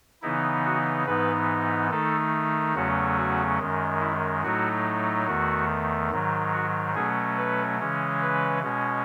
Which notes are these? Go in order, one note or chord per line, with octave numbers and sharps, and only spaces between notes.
C#3 E3 B3 D#4 E4
F#4
G#2 E3 B3 D#4 B4
D#3 A3 D#4 A4
E2 C#3 F#3 A3 C#4 F#4
F#4
F#2 D#3 G#3
E4
A2 F#3 A3 D#4 F#4
E2 D#3 A3 F#4
G#2 D#3 F#3
F#4
B2 F#3 A3 C#4 G#4
B4
C#3 E3 G#3 C#4
B4
B2 G#3 C#4